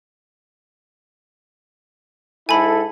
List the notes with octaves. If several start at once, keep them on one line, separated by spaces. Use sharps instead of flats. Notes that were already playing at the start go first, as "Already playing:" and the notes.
G#2 E4 A4 G#5 B5